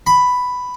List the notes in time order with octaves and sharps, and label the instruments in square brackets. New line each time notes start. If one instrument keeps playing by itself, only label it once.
[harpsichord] B5